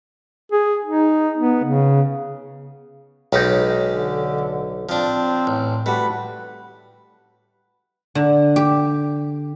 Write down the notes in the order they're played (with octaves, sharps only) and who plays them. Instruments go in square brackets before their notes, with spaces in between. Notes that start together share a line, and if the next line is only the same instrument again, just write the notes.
[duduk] G#4
D#4
B3
C#3
[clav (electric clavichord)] B1 D#4 [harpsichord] G#3 C#4 G4
[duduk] D3
[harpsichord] F3 D4 [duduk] C4
[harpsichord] A1
[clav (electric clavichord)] G3 F#4 G4 [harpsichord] A3 [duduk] B4
[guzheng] D3
G4